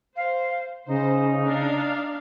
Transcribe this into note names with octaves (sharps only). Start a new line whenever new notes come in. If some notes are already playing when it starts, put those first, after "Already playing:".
C5 F5
C#3 D#4 C5
D4 F5